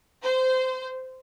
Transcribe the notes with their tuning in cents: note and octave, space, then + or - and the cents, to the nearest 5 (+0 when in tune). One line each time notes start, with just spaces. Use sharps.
C5 -20